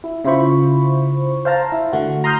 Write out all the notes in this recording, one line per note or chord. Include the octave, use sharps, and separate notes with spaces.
E4
C#3 E4 F4 C5 B5 C#6
C5 F5 A5 A#5
E4
D3 A3 F#4
A#5 C6 D#6 F6 G6 C7